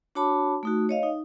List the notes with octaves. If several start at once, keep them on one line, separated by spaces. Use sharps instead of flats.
D4 F#4 C#5 A5 B5 D6
A3 D#4 F#4
C#5 D#5 F5
D#4